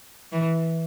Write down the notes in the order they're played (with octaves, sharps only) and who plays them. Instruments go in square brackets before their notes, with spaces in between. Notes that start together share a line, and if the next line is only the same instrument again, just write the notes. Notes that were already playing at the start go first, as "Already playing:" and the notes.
[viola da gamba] E3